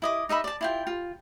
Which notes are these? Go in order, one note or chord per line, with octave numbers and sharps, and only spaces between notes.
E4 D#5 D6
D#4 D#5 E5 B5
D5 A5
E4 F4 G5
F4